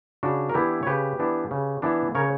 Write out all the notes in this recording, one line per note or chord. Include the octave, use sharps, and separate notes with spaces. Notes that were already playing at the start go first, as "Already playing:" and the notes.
C#3 D4 F#4
A#4
E3 B3 D4 E4 G4
C#5
C#3 G4 B4
E3 B3 D4
C#3
E3 B3 D4
C#3 A#4 C#5